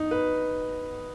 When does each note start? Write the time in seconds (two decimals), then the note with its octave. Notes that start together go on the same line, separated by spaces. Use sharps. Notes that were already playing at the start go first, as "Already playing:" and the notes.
Already playing: D#4
0.11 B4